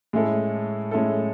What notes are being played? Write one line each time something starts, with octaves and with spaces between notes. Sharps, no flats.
A2 G#3 C#4 E4 A4
A2 G#3 C#4 E4 A4